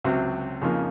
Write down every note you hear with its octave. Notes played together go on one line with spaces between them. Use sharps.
C#2 C3 F#3 C4
F2 C#3 F3 A#3 D#4